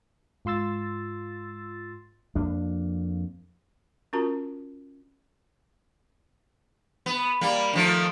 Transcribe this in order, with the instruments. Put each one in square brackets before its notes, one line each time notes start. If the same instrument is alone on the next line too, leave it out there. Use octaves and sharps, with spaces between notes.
[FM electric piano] G#2 F4 C6 E6 A6
[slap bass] F2 A#3 D4
[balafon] C#4 F4 F#4 A#4 A5 A#5
[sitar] B3
G3 A#3
D#3 F3 A3